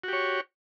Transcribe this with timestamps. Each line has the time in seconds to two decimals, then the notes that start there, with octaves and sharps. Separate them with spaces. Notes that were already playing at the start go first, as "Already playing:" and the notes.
0.04 F#4
0.08 G4
0.13 C#5